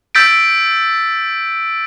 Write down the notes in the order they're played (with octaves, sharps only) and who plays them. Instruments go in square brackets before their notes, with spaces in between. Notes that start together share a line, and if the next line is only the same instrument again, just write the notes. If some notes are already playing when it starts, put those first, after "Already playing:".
[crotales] E6 G6 A6 B6 D7